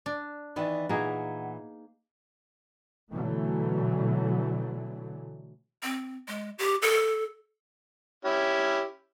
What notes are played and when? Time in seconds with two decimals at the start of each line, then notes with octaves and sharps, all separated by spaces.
0.06 D4
0.56 D#3 E3 B3 D#4 D5
0.89 A#2 E3 A#3 D#4 G#4 F#5
3.14 B2 D3 E3 F#3 A3
5.83 C4
6.28 G#3
6.59 G4
6.82 A4
8.25 C#4 E4 G4